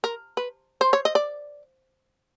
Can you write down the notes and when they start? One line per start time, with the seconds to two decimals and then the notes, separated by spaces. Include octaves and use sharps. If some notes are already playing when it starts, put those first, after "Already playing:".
0.04 A#4
0.37 B4
0.81 C5
0.93 C#5
1.05 D#5
1.15 D5